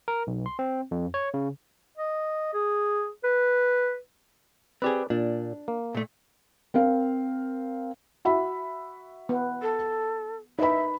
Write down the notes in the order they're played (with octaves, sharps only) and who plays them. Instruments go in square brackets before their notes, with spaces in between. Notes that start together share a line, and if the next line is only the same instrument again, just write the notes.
[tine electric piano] A#4
B1
C6
C4
F2
C#5
C#3
[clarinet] D#5
G#4
B4
[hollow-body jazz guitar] C4 G4 G#4 [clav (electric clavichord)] B4 D5
[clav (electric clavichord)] A#2 [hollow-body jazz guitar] D4
[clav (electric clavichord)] A#3
[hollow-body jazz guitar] A#2 A3
[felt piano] C4 A#4 F5
F#4 E5 B5
[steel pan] B3
[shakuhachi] A4
[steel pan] D#4 [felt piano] B4 B5 [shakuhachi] E5